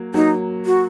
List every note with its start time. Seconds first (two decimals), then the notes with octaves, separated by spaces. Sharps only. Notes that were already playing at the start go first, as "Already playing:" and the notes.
Already playing: F#3 A#3
0.14 F#3 A#3 D#4
0.66 F#4